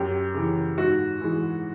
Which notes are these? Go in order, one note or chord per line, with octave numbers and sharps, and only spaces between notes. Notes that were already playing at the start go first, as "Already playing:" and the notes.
Already playing: F#2 G4
C#3 E3
G#2 F#4
E3 G#3